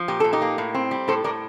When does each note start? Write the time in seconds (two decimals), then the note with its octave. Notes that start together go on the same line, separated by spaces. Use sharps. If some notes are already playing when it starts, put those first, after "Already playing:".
Already playing: F3
0.08 A#2 G4
0.20 A#2 A4
0.33 D#4 G4
0.42 A#3
0.58 A2
0.74 C4
0.91 G3
1.08 A2 A4 C5
1.24 A2 A#4 D5